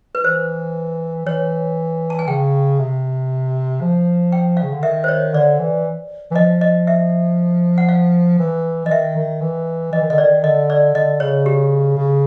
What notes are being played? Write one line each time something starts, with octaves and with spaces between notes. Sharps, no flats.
B4
E3 C5
E3 C#5
A5
G#5
C#3 G5
C3
F3
G5
F5
C#3
D3
D#3 E5
C5
C#5
D3 D5
E3
E3
F3 D#5
D#5
E5
F#5
F5
E3
E3 D#5
D#3 E5
D#3
E3
E3 D#5
D#3
D3 D#5
D#3 D5
D3 D#5
D5
D3 D#5
C#3 C#5
G4
C#3